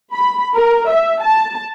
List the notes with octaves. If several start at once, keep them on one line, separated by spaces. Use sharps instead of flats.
B5
A#4
E5
A5